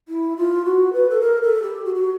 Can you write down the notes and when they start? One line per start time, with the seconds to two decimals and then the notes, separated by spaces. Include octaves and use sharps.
0.08 E4
0.37 F4
0.65 F#4
0.93 B4
1.10 A4
1.21 A#4
1.42 A4
1.63 G4
1.85 F#4
1.95 F#4